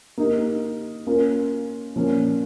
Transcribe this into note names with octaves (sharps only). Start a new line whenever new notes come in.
A#3 D#4 G4
A#3 C#4 F4 A#4
A#2 F3 A#3 C#4